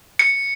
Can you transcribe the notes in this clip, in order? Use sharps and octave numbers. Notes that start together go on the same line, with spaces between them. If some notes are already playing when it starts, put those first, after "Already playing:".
C#7